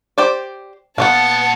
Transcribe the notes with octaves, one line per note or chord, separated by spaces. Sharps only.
G4 C5 D5
A#2 B3 C#5 F5 F#5 A5